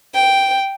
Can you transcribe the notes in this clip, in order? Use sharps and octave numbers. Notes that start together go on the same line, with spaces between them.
G5